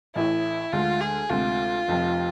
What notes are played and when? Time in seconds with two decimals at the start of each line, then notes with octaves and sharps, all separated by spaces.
0.15 A1 A2 E3 E4
0.73 D2 D3 G#3 F4
1.01 G#4
1.30 D2 C3 G#3 F4
1.88 F1 F2 C3 F3